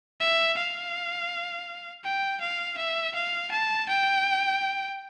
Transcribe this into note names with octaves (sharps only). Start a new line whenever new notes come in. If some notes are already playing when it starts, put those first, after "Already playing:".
E5
F5
G5
F5
E5
F5
A5
G5